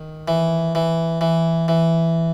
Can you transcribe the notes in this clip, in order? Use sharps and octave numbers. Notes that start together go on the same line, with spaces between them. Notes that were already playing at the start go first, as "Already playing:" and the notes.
Already playing: D#3
E3
E3
E3
E3